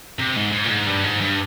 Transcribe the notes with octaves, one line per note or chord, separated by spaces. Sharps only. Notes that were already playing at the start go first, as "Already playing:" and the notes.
C3
G#2
G#2
A#2
G#2
G2
G#2
G2